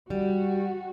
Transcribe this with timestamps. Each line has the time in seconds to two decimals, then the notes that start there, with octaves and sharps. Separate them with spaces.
0.10 G3 F#4